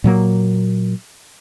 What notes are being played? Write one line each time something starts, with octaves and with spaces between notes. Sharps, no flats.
A#2 F#3 A#3